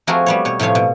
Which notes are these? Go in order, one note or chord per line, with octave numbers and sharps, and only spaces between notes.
F3 A3 C4 F#4 G#4 A#4
G3 B3 C#5
B2 C#5
A2 C3 F3 C#5 F5
B2